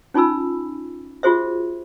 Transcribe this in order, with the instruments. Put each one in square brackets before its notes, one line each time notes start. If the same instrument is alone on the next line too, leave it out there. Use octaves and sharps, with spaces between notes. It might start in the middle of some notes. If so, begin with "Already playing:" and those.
[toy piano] C#4 D#4 F4 G#5 B5 E6
F4 F#4 G#4 C5 E5